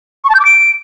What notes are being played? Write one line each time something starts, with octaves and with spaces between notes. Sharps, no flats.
C#6
A5
G6
D6
D7